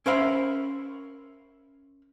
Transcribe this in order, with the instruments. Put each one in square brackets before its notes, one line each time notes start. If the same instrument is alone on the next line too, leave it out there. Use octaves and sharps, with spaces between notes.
[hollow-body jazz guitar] C#4 A#4 C5 E5 F5 B5